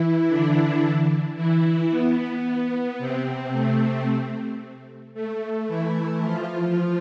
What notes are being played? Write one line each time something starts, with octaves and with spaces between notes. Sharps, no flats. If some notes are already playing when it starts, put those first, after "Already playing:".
Already playing: E3 E4
D3 D4
E3 E4
B3
B3
C3 C4
A3
A3
E3 E4
F3 F4